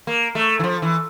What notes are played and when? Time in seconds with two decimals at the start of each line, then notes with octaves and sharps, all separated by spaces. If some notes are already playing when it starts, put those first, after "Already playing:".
0.07 A#3
0.35 A3
0.59 E3
0.64 F3
0.82 E3